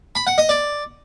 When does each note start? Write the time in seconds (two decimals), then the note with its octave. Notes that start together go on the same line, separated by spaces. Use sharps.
0.15 B5
0.27 F#5
0.38 D#5
0.49 D5